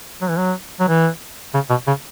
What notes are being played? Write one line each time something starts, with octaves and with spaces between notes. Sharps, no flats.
F#3
E3
F#3
F#3
E3
C#3
B2
C#3